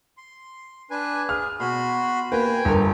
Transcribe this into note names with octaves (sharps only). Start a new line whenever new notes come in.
C6
D4 B4 G#5
G#4 F6
B2 F#4 B5 C6
A#3 F#4 G4 B4 G5 G#5
G1 C#3 A#4